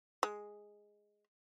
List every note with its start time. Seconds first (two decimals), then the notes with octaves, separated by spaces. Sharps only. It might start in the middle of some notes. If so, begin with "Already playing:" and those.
0.23 G#3